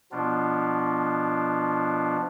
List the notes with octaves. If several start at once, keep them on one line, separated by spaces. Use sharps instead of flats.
B2 F3 B3 D4 F4